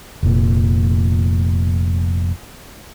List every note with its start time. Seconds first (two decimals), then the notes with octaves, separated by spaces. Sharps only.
0.23 F1 A#2